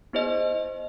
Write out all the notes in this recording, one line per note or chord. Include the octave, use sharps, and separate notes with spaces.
B3 E4 G#4 C5 D#5